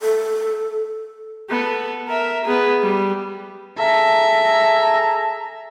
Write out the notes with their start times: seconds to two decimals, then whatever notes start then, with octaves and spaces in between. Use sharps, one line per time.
0.01 A4
1.49 B3 A4
2.08 A#4 E5
2.45 B3 G#4
2.82 G3
3.79 G#4 A4 E5 A#5